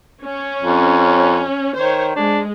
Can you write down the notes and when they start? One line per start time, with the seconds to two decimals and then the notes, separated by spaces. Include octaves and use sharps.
0.25 C#4
0.63 F2
1.74 D#3 C5 C#5
2.16 G#3 D4